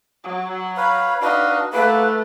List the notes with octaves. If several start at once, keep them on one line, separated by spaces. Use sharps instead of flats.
F#3
B4 C#5 F5 B5
D4 D#4 F#4 B4 F5
A3 A#3 E4 B4 F#5